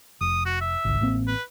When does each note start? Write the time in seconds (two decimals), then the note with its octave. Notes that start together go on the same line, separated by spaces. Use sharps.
0.21 F1 D#6
0.46 F#4
0.61 E5
0.85 G#1 C#2
1.01 A1 A#3 C4
1.27 B4